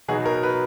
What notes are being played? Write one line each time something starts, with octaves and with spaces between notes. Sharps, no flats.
B2 F#3 B3 D#4 G#4
A#4
B4